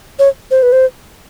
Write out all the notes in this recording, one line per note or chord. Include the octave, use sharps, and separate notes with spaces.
C#5
C5
B4
C5